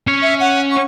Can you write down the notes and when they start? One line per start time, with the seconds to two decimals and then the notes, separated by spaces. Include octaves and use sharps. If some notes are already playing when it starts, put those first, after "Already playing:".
0.07 C#4 C#5
0.22 E5
0.40 F#5
0.71 C#6